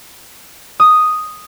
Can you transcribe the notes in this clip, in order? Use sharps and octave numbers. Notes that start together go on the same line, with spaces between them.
D#6